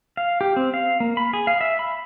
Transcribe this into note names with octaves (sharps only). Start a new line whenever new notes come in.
F5
G4
C4
F5
A#3
B5
G#4
F5
E5
B5